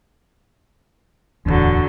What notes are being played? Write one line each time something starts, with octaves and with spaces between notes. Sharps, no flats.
D1 G#1 E2 D3 F#3